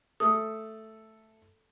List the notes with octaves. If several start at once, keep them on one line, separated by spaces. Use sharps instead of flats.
A3 A4 D#6